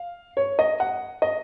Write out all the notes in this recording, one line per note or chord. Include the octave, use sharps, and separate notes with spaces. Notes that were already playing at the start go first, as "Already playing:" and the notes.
Already playing: F5
C#5
D#5
F#5
D#5